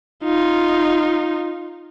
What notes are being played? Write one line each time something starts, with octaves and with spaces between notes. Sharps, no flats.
D#4 F4